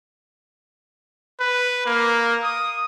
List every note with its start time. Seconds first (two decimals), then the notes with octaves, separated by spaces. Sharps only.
1.40 B4
1.86 A#3
2.43 D#6